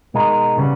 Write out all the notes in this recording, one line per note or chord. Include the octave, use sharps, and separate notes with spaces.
B2 G#3 D#4 A#4
C#3 G3 B3